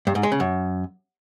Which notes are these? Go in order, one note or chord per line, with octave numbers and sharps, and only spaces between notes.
G2
G#2
G#3
C#3
F#2